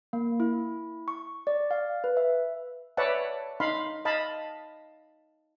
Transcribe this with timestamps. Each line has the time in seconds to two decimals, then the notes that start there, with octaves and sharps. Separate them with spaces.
0.13 A#3
0.40 E4
1.08 C#6
1.47 D5
1.71 F5
2.04 B4
2.17 E5
2.97 B4 C#5 D5 E5 F#5 A5
3.60 D#4 F5 B5 C6
4.05 D#5 F5 A5 B5